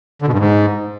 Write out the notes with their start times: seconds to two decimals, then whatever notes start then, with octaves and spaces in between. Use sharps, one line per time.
0.22 D3
0.28 B2
0.33 G2
0.39 G#2